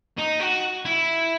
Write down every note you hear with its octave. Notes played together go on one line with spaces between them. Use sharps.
D#4
F#4
E4